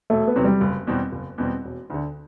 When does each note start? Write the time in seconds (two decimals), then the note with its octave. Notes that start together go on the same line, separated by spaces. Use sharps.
0.10 E1 A3
0.28 B3
0.36 E2 C3 F#3 C4
0.44 G3
0.61 F#1
0.87 E2 B2 G3 C4
1.12 F#1
1.38 E2 B2 G3 C4
1.64 E1
1.90 D2 D3